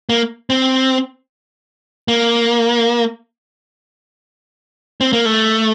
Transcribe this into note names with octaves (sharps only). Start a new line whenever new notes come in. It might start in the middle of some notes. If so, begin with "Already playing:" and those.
A#3
C4
A#3
C4
A#3
A3